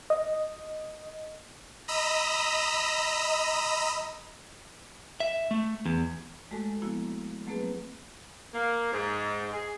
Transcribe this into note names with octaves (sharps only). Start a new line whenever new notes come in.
D#5
D#5 A#5 B5 D#6 E6
E5
A3
E2
G#3 A3 F#4 A4 G#5
F3 A#3 B3 E4 F#4
F#3 A3 A#3 C4 G#4 B4
A#3
G#2
G#4